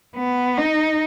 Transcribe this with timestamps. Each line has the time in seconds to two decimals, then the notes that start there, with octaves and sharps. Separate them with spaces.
0.17 B3
0.58 D#4